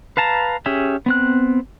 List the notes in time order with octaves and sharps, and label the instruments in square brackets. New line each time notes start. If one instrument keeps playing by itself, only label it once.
[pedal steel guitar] B4 F5 A5 A#5
C#4 G4 G#4 E5
B3 C4 F#6